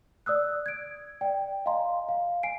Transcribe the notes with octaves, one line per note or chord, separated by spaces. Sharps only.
D5 D#6 E6 F#6
G#6 D7
D5 G5
D#5 F5 G#5 A#5 C6
F5
G#5 C7 D7